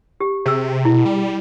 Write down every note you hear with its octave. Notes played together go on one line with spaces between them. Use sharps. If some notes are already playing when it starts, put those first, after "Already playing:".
G4
C3 G#4 E6
B2 E4
G3